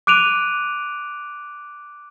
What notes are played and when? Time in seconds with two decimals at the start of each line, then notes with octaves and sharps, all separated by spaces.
0.07 D6 F#6 D7 D#7 F7